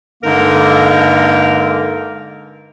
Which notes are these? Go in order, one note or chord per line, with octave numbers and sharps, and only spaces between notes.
G2 D3 G#3 A#3 D#4 A#4